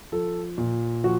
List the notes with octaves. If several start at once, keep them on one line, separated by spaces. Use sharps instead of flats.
F3 A4
A#2
F3 F#4